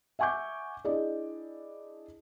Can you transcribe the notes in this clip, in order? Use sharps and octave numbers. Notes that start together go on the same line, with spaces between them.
E5 F#5 G#5 C#6 D6 G6
D4 E4 G#4 D5 D#5